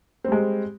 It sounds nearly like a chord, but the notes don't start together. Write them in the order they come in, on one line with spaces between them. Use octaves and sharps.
C4 G3 G#3